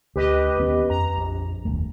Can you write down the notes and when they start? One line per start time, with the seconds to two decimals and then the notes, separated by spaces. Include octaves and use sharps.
0.16 D2 G4 B4 D#5
0.59 D#2 B3 C#4
0.90 F2 A#5
1.16 A#1
1.65 F1 D#2 A3